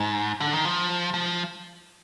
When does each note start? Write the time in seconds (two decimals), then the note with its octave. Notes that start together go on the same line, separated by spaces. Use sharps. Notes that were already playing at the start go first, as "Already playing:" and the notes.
Already playing: G#2
0.40 D3
0.53 D#3
0.65 F3
1.14 F3